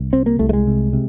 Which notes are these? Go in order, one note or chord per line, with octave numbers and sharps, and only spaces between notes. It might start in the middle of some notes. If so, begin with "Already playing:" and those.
Already playing: C2
C3 C4
A#3
C2 A3
A3
G#3
C3
C3